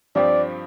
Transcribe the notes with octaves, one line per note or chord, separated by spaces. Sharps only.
G2 F3 C4 G4 D5